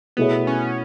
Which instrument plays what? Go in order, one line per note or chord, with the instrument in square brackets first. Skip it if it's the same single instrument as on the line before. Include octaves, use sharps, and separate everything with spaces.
[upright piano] B2 A3 E4 G#4 C#5 [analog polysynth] B3
[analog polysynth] C#4